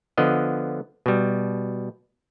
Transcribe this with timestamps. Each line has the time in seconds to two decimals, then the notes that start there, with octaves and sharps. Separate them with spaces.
0.18 D3 F3 B3 D#5
1.06 B2 G3